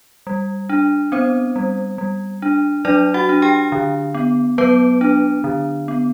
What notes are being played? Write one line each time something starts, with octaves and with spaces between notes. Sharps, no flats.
G3
D4
B3 C4 C5
G3
G3
D4
F#3 D4 D5
F#4 F#5
D4
G4 G5
D3
B3
F#3 B3 B4
D4
D3
B3